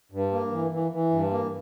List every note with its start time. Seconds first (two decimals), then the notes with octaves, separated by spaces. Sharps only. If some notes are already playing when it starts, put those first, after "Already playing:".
0.12 G2
0.31 A#3
0.51 E3
0.71 E3
0.92 E3
1.11 G2
1.31 A#3